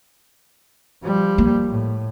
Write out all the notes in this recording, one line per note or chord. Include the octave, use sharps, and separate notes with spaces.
F3 G3
A#3
A2